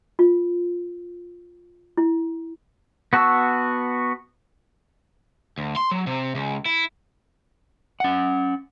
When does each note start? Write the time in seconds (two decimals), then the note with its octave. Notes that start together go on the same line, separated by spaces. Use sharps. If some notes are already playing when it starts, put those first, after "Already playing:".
0.19 F4
1.97 E4
3.13 B3 F#4 A5 C#6 E6
5.58 D2
5.76 C6
5.91 F#3
6.07 C3
6.35 C#2
6.66 E4
8.00 C#4 F#5